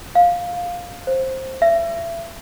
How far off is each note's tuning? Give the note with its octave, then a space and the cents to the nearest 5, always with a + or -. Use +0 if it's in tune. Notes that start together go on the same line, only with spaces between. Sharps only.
F5 +10
C5 +10
E5 +35